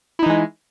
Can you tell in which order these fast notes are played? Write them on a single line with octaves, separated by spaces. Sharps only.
E4 D#4 E3 G#3